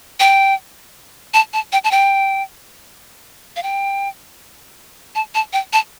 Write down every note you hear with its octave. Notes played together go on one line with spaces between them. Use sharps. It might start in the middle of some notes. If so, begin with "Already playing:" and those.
G5
A5
A5
G5
A5
G5
F5
G5
A5
A5
G5
A5